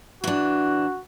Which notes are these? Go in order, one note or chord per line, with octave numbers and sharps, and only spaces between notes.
E3 D4 F#4